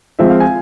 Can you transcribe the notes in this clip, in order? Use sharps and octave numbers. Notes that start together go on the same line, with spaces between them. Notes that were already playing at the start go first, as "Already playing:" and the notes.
F3 G#3 C4 F4 E5
F5
G#5